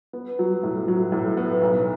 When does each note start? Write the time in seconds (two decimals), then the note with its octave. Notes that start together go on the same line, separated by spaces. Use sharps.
0.13 B3
0.39 F#3
0.63 A2
0.88 F#3
1.12 A2
1.37 B3
1.62 B1